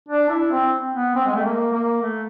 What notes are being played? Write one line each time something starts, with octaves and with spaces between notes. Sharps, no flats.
D4
E4
C4
B3
C4
G#3
A3
A#3
A#3
A3